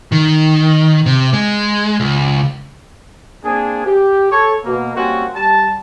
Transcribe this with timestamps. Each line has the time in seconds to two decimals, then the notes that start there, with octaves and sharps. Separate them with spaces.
0.12 D#3
1.06 C3
1.33 G#3
2.00 C#2
3.44 A#3 C4 D4 G#4
3.86 G4
4.32 A4 C#5
4.65 B2 A#3
4.96 G3 A#3 C4 C#4 F#4
5.35 G3 A5